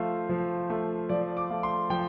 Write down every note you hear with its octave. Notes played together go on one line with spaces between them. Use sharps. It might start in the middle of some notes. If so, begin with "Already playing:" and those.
Already playing: F3 A3 F4 C5
F3
A3 F4
F3 D5
D6
A3 F4
C6
F3 G5